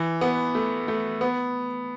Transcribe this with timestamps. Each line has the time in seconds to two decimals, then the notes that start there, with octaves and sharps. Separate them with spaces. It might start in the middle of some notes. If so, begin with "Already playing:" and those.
Already playing: E3
0.21 B3
0.55 A3
0.88 A3
1.21 B3